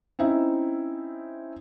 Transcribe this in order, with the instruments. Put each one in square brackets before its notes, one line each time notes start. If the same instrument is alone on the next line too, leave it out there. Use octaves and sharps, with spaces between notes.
[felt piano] C4 C#4 D#4 E4 E5